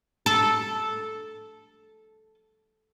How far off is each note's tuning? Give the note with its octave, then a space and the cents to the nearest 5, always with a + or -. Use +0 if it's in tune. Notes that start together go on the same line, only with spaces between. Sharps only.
A4 -10